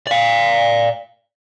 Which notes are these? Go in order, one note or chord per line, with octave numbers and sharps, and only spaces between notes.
D5 F5